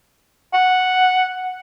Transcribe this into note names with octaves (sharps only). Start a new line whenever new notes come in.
F#5